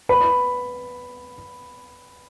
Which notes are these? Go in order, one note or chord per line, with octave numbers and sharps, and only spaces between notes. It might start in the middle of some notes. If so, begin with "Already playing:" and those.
B4 B5